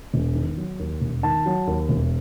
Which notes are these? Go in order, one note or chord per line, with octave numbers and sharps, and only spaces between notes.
E1
D#3
F#3
D#2
E1
D#3 A5
F#3
D#2
E1